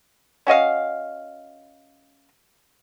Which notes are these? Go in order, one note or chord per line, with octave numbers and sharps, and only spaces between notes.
C#4 F#4 D#5 F5